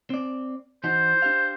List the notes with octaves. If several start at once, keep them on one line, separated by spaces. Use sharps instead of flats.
C4 D5
E3 D#4 F#4 C5
D4 G4 F5